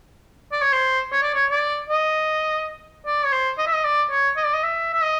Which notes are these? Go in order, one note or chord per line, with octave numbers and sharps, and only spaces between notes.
D5
C#5
C5
C#5
D5
C#5
D5
D#5
D5
C#5
C5
D#5
E5
D#5
D5
C#5
D#5
D5
D#5
E5
E5
D#5